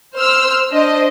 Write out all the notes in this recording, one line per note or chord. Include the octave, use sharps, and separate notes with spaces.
C5 E6 F6
D4 C5 D#5